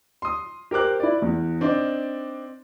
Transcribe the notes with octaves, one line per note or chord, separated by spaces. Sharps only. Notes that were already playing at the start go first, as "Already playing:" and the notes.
C6 D#6
G4 A#4 C5 D6 F#6
E4 D5
E2
C4 D4 D#4